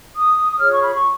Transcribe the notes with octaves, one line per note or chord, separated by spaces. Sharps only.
D#6
D#6
F4 G#4 C#5 F6
C#6
B5
C#6